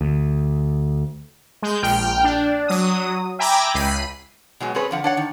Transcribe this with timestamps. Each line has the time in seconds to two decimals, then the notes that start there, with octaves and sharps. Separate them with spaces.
0.01 D2
1.62 G#3 G6
1.82 A#1 G5 F6
2.24 D4
2.68 F#3 D#6
3.39 E5 G5 G#5 A#5 B5 D6
3.74 C#2 B5 C7 D#7
4.60 B2 F#3 G#3
4.75 C4 C#4 G#4 B4 C#5
4.91 D3 F3 F#5
5.04 D4 C#5 F#5
5.17 D#3